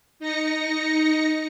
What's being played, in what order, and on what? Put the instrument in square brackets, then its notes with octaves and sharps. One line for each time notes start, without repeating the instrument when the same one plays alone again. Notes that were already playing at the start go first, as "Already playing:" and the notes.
[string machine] D#4 A#6 C#7